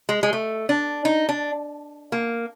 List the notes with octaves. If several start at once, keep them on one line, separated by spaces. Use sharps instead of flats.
G#3
G#3
A3
D4
D#4
D4
A#3